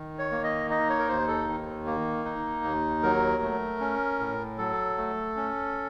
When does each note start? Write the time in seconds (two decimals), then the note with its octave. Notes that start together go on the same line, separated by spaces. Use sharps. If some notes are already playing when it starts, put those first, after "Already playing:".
Already playing: D#3
0.19 C#5
0.31 A#3
0.44 D#5
0.70 D#4 D#5
0.90 C#5
0.99 A#4
1.09 D#2 C5
1.28 A4
1.48 D#3
1.87 A#3
2.25 D#4
2.64 D#2
3.03 F#3 A#4
3.43 A3
3.81 C#4
4.19 A2
4.58 F#3 A4
4.97 A3
5.36 C#4